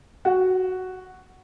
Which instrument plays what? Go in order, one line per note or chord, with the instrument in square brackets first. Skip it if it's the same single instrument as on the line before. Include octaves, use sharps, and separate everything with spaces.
[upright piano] F#4